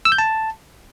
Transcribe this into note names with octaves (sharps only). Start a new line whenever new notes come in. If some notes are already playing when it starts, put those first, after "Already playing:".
E6
G6
A5